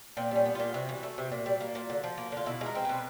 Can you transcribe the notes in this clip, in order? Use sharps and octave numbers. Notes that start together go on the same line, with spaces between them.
A#2 C4
G3 C#4
B3
A#2 F4
C3 F#4
E3
A3
C3
A#2
G3
A#3
A#2
D3
F3
A#3
D3 F4
B2 E4
G#3
A#4
C4
B2 B4